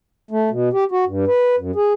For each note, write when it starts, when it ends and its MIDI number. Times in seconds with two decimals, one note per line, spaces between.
0.31 0.50 57
0.51 0.69 47
0.73 0.84 67
0.92 1.05 66
1.06 1.25 43
1.27 1.56 71
1.58 1.71 42
1.76 1.93 68